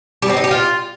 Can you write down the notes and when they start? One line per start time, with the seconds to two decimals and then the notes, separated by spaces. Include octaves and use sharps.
0.22 G3
0.29 C4
0.37 D#4
0.44 G4
0.51 F4